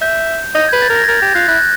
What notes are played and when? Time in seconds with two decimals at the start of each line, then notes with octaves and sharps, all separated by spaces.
0.01 E5 G6
0.55 D#5 G6
0.68 B4 G#6
0.82 A6
0.90 A#4
0.95 A#6
1.04 G#6
1.08 A#4 A6
1.22 G4 G6
1.35 F4 F#6
1.48 E4 F#6